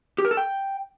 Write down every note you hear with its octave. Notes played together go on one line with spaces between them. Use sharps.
G4
A#4
A4
G5